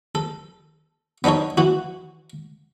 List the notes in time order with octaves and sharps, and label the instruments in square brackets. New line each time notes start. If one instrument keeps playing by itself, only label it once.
[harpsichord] A4
B3 D4 D#4 A4 C#5
E3 F#4